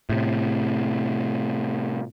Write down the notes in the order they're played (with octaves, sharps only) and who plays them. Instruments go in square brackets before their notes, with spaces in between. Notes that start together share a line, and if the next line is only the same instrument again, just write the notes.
[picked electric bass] A2 C3